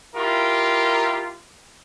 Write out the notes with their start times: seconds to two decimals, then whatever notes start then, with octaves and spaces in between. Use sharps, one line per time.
0.16 E4 F4 G4 A#4